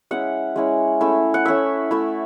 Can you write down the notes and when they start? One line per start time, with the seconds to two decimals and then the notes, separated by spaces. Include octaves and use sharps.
0.11 G#3 C#4 E4 F#5
0.56 G#3 C#4 E4
1.01 A3 C#4 E4
1.34 F#5
1.46 A3 C#4 E4 E5
1.91 A3 E4